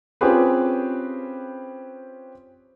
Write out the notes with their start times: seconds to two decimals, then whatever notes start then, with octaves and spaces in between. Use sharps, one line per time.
0.21 C4 C#4 F4 G4 G#4 B4